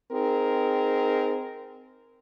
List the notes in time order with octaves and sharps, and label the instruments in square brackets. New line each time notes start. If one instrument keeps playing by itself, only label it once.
[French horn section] C4 D#4 G#4 A#4